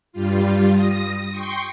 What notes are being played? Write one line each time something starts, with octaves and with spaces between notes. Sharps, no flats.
G2 G3 F4
D#6 A#6
G5 C6 C#6